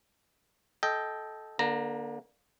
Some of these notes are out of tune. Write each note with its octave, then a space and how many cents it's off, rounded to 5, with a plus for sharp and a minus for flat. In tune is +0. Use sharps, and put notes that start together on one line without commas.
A4 -15 D#5 +10 G5 +0
D3 +0 A#3 +35 A#5 -5